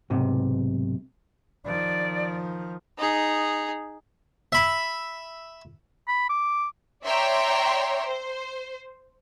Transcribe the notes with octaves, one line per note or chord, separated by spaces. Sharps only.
B1 G#2 C3
D#3 F3 D5
D#4 G#4
E5 B5
B5
D6
C#5 D5 E5 G5 A#5 C6
C5